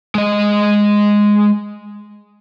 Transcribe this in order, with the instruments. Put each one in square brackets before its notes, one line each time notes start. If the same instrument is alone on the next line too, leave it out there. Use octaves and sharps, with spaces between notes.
[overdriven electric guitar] G#3 D#5